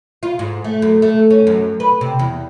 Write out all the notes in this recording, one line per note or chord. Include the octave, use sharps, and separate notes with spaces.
F4
G#2
A3
F#2
A3
C#4
F#2
B4
C3
E2